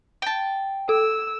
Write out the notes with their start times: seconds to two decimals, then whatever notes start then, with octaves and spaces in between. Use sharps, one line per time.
0.22 G5 A5
0.89 A4 E6